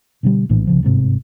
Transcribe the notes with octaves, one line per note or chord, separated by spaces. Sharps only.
B2 D3 F#3 G3
A#1 A2 E3 D4
C2 C#3 F3
G1 G#2 C3